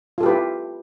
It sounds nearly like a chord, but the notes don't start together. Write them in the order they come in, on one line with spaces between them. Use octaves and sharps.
F4 A4 G4 B4 E4